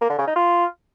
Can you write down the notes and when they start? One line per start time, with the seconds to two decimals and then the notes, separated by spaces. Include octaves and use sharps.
0.01 A#3
0.10 D3
0.18 C#3
0.27 D#4
0.36 F4